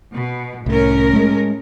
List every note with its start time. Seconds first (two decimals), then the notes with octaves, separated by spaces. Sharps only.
0.15 B2
0.66 C2 A2 C#4 A#4
1.13 G#3 A3